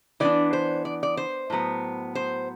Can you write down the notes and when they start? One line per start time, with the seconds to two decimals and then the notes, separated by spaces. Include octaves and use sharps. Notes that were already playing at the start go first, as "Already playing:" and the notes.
0.20 E3 B3 D4 D5
0.53 C5
0.85 D5
1.03 D5
1.17 C5
1.50 A2 F#3 B3
2.15 C5